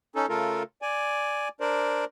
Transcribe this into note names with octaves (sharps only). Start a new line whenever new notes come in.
C#4 D#4 A4
C#3 A3 F4 A4 A#4
D5 G#5
D4 A#4 C5 D5